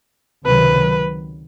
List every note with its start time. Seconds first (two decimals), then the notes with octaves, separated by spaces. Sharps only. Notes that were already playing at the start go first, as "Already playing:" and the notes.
0.45 C#2 C3 D#3 F#3 B4